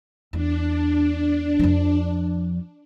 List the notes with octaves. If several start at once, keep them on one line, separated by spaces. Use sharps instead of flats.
E2 D4
F2 F3